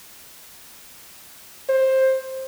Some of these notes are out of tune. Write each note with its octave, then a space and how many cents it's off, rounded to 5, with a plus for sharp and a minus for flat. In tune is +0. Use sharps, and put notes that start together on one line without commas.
C5 +15